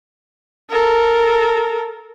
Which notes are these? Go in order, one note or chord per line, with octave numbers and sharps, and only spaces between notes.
A4 A#4